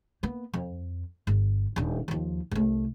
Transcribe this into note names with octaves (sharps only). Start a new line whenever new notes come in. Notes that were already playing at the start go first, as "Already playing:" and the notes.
A#3 B3
F2
G1
D#1 D4
D#2 F3
C2 A3